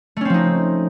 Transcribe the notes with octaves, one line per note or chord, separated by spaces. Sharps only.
F3 A3 C4 C#4 D#4